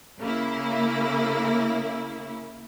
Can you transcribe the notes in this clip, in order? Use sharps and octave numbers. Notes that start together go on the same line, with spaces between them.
C#3 A#3 E4